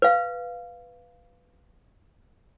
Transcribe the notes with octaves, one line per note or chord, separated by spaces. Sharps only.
B4 F5